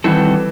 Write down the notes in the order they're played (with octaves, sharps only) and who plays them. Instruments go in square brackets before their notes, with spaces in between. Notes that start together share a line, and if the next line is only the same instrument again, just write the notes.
[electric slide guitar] D#3 G3 C4 F#4 A4 [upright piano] E3